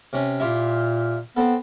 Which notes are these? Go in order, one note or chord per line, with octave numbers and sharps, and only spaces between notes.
C3 C#4
A#2 E4 F4 G4
B3 C4 A4